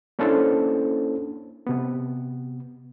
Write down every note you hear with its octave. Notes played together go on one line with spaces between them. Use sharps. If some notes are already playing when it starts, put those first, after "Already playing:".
A#3 C#4 D4 E4 A4 C5
C3 B3